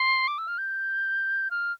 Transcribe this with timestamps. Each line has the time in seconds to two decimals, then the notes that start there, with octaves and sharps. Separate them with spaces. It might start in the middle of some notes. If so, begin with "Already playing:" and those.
Already playing: C6
0.28 D6
0.38 E6
0.48 F6
0.58 G6
1.51 F6